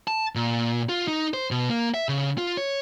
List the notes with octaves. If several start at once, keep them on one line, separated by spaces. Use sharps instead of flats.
A5
A#2
F4
D#4
C5
B2
A#3
E5
C#3
F4
C#5